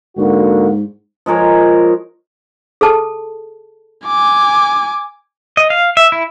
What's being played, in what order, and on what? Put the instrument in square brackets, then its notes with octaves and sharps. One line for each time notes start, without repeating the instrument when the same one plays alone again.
[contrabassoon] G#2 [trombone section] D3 A#3 F#4
[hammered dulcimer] F3 G#3 A#4 C#5
[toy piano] G#4 A4 A5
[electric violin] G#5 D6
[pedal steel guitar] D#5
F5
E5
E4